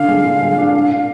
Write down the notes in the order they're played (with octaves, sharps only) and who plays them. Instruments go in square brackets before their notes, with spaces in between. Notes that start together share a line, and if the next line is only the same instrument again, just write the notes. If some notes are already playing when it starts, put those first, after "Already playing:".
Already playing: [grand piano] D3 D4 [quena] F5
[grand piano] G#3
D3
G#3
D4
D4
D4